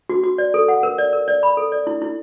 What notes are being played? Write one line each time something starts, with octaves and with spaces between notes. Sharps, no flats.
F#4
F#4
D5
A4
F#5
A#4
D5
A#4
D5
B5
A4
D5
E4
E4